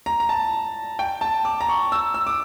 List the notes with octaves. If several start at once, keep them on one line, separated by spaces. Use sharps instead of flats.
A#5
A#5
A5
G5
A5
D6
A#5
C#6
E6
E6
D6